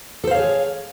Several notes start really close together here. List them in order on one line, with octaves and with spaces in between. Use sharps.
A4 C5 F5 C#5 G#4